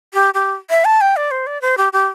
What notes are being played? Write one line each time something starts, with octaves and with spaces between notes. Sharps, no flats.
G4
G4
E5
A5
G5
D5
C5
D5
C5
G4
G4